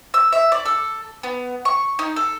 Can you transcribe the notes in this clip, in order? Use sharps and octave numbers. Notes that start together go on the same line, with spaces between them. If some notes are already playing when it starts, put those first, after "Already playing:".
E6
E5
D5
A4
B3
C#6
D#4
A4